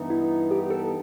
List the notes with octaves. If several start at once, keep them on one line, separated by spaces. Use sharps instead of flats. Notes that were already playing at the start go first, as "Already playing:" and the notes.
Already playing: G2 E3 B3 D#4
E4
G4
A4